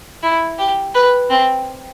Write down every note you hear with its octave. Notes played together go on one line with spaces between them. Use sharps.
E4
G4
B4
C4